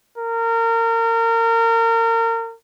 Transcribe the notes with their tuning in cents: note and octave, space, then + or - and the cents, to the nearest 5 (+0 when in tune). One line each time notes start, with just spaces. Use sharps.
A#4 -30